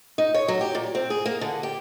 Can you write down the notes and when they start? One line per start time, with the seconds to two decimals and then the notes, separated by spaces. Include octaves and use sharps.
0.18 D#4
0.34 C#5
0.48 F#3
0.61 G4
0.75 A#2
0.95 C4
1.10 G#4
1.25 A#3
1.41 D3
1.63 G4